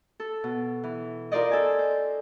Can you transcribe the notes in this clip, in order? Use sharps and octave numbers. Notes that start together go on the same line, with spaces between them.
A4
B2
E3
F4 A#4 C5 D5 D#5
A4 G#5
C5